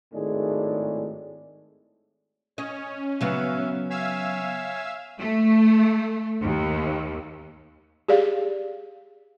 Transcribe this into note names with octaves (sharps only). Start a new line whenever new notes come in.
G#1 A2 D#3 G#3 D4 G#4
C#4 C#5 D#5
C#3 F#3 B3 E5 F5
C#5 E5 F5 G#5 E6
A3
D#2
G4 G#4 D5 F5